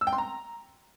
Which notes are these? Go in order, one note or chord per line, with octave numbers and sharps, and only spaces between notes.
E6
G5
C6
A#5